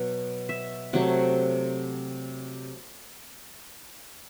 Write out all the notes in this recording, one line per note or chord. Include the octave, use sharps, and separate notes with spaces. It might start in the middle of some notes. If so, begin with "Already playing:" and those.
Already playing: B2 F#3 F#5
E5
C3 F#3 A3 F#5